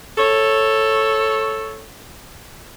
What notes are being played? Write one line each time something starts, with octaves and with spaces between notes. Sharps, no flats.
A4 C#5